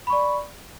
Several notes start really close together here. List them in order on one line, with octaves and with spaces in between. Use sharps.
B5 C#6 D5